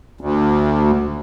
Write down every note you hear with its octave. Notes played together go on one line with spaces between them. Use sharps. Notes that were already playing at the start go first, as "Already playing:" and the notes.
D2